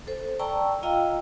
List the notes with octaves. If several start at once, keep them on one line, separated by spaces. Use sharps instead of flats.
A4 C5
D5 G5 A5 A#5 C#6 E6
F4 D#5 F5 G5 A#5 E6